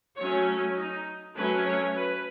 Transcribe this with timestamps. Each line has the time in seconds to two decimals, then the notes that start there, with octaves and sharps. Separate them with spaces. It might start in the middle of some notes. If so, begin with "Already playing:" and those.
0.16 F#3 A3 C#4 C#5
0.76 D#4
1.36 F#3 A3 C#4 B4
1.66 C#5
1.95 B4